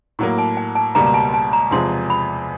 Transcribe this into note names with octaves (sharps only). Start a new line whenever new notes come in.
A2 F#3 A#3
A5
G#5
A5
C#2 B2 G3 A#3 A#5
A#5
A5
A5
A#5
E2 C3 F3 G#3 C6
B5